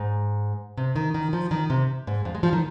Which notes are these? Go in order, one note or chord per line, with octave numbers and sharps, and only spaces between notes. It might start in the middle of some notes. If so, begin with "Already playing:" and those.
Already playing: G#2
C3
D#3
D#3
F3
D#3
C3
G#2
F2
G#3
F3
D#3